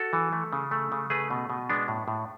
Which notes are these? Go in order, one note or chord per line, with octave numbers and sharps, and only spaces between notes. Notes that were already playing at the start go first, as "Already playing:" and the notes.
Already playing: F#4 A4
E3
A3
C#3
A3
C#3
A3 G#4 B4
B2
B2
G#3 B3 D4
A2
A2